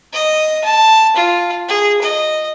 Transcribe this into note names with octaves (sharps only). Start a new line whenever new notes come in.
D#5
A5
F4
G#4
D#5